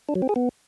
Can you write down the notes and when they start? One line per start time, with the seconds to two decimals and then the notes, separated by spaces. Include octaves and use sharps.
0.09 D4
0.15 F#3
0.22 C4
0.29 G#4
0.36 B3